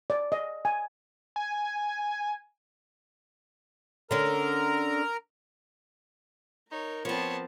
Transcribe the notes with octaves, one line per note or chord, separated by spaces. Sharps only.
D5
D#5
G#5
G#5
D3 C#4 A#4 A#5
D#4 A#4 C#5
F3 B3 C4 C#5 A5